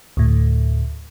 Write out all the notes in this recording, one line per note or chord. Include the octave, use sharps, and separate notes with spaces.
D2 A2